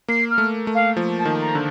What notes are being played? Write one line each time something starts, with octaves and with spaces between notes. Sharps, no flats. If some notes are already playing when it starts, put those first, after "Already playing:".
A#3 C7
F6
A3
A3
F5
F3
A5
D#3
A#5
D3